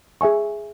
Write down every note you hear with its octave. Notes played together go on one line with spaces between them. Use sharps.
G#4 E5 G#5 C#6